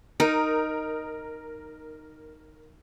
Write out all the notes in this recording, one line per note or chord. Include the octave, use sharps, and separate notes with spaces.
D#4 A#4